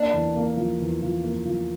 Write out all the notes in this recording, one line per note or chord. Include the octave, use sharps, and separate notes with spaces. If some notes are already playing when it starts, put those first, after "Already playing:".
Already playing: A#3 D4
E2
A#3
F3
E2
F3
A#3
F3